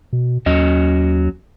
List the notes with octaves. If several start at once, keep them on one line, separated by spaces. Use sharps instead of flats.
B2
D#2 F#3 C#4 D#5